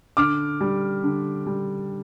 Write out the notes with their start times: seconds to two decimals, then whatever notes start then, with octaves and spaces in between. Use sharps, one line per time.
0.17 D3 D6 F6
0.61 G3
1.03 D3
1.47 G3